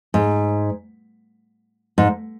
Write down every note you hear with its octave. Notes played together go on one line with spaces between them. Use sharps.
G#2
G#2